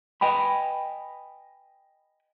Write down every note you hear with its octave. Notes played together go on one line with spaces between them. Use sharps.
B4 D#5 G5 G#5 B5